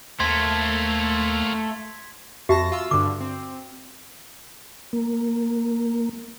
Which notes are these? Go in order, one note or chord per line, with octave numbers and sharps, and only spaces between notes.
D#2 A3 A#3 C4 C6 G#6 B6
F2 F#4 G4 E5 A5 A#6
F4 E6
G2 D3 D6
C4
A#3